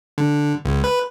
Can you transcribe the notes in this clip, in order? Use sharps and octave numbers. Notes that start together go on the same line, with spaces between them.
D3
C#2
B4